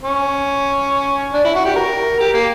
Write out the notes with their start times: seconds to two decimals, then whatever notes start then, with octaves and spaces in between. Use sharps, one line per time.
0.03 C#4
1.33 D4
1.45 E4
1.55 F#4
1.65 G4
1.76 A#4
2.20 G4
2.34 A#3